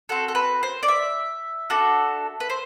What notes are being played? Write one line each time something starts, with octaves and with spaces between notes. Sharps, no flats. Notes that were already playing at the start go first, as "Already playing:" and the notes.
C4 F#4 A4
A4
B4
C5
D5
E5
D4 F#4 A4
B4
C5